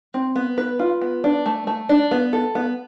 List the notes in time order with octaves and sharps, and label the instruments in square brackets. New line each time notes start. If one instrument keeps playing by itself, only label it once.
[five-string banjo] C4
B3
B4
F4
B3
D4
A3
A3
D4
B3
A4
B3